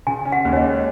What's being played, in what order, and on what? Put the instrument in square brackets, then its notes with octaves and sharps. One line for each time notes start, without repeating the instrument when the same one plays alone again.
[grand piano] C#3 [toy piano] G#5
[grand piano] C#4
[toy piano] F#5
[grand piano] D#2
[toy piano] C#5
D#5
[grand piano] G#3